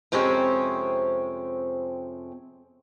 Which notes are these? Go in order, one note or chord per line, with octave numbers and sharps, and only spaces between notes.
F2 C3 G#3 C4 C#4